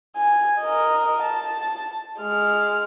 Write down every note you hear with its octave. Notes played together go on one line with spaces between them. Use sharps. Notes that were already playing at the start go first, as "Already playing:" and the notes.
G#5
A#4 D#5
A5
G#3 F6